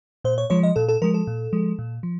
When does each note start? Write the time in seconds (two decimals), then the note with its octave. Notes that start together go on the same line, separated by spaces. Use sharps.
0.24 A#2 C5
0.38 C#5
0.50 F3 G#3 C#5
0.63 D#5
0.76 A#2 A4
0.88 A4
1.02 F3 G#3 A#4
1.14 A4
1.27 A#2
1.53 F3 G#3
1.79 A#2
2.03 F3